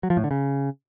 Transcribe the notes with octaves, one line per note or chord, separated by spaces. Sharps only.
F#3
F3
A2
D3
C#3